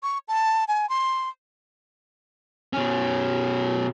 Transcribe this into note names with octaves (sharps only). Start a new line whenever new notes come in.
C#6
A5
G#5
C6
B2 C#4